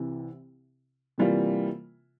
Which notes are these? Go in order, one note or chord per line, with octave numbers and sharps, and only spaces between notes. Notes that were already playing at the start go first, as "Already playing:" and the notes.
Already playing: C2 C3 E3
C3 E3 G3 A#3 F4